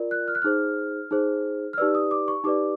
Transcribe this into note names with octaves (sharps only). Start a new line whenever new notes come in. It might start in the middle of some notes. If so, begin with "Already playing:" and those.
Already playing: F4 A#4 D5
F#6
F6
F#6
D#4 G#4 C5 F6
D#4 G#4 C5
F6
D#4 G4 B4 D5 E6
D#6
D6
C#6
D#4 G4 B4 D5 D6